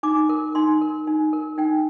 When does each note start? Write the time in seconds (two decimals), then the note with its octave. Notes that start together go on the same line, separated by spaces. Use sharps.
0.03 D#4 D6
0.29 A#4
0.55 D#4 C6
0.82 A#4
1.07 D#4
1.33 A#4
1.58 D#4 G5